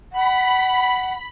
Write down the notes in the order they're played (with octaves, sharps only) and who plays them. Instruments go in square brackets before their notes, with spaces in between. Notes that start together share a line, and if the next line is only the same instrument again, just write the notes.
[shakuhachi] F#5 [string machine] B5